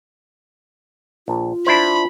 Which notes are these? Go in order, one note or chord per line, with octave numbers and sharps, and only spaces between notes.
A#1 F4
D4 E4 C5 B5